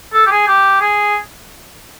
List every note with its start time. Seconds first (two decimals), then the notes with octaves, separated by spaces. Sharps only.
0.13 A4
0.26 G4
0.31 G#4
0.47 G4
0.81 G#4